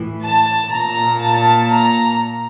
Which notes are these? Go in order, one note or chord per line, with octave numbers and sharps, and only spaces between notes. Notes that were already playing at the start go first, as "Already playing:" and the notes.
Already playing: A2 E3
A5
A#2 A#5
A5
A#5